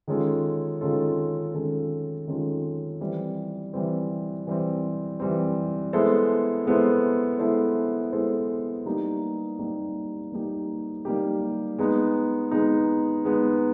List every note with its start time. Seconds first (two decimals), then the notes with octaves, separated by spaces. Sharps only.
0.07 D#3 G#3 C#4 F4 A4
0.81 D#3 G#3 C#4 F4 A4
1.54 D#3 G#3 C#4 F4 A4
2.28 D#3 G#3 C#4 F4 A4
3.01 E3 G3 C4
3.74 E3 G3 C4
4.47 E3 G3 C4
5.20 E3 G3 C4
5.93 G#3 B3 E4 A4 C5
6.66 G#3 B3 E4 A4 C5
7.39 G#3 B3 E4 A4 C5
8.13 G#3 B3 E4 A4 C5
8.86 G3 A#3 D#4 G4
9.59 G3 A#3 D#4 G4
10.32 G3 A#3 D#4 G4
11.05 G3 A#3 D#4 G4
11.78 G#3 B3 D#4
12.51 G#3 B3 D#4
13.25 G#3 B3 D#4